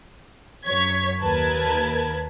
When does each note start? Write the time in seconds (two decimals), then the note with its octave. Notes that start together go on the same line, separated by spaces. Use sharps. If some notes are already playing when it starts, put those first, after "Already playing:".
0.66 F#2 C#5 G#6 B6
1.22 D#2 A#4 B4 A5 G#6